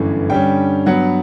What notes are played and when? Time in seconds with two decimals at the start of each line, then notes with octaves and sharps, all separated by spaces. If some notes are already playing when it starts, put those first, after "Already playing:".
Already playing: G1 F#2 E3 A3
0.29 G2 D3 G3 C#4 G5
0.86 G2 F#3 B3 F#5